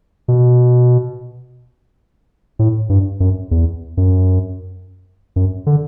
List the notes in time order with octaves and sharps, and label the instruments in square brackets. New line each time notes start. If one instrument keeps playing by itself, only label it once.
[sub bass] B2
A2
G2
F#2
E2
F#2
F#2
D3